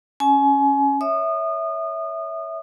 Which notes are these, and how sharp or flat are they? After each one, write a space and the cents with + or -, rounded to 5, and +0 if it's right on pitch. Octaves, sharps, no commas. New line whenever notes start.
C#4 -5 G#5 +30
C#5 +15 E5 -10 D#6 -30